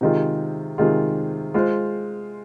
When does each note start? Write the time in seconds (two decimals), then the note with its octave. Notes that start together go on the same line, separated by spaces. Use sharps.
0.01 C3 D#3 G#3 F4 G#4
0.78 C3 D#3 G#3 F4 G#4
1.54 G#3 F4 C5